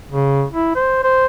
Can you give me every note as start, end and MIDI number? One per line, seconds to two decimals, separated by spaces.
0.11 0.45 49
0.52 0.73 64
0.75 0.99 72
1.03 1.26 72